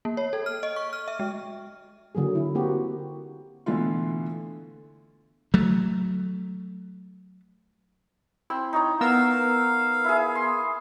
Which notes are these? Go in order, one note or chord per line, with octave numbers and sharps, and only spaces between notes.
A#3
C#5
A4
F6
D#5
C#6
F6
E5
G#3
D3 F#3 A#3 G#4
D3 E4
A#3 C4 F#4 G4
B2 D3 E3 A3 F4
F#3 A3
C4 E4
D#4 C#5 A#5
B3 A#4 F5 E6
E4 G#4
C6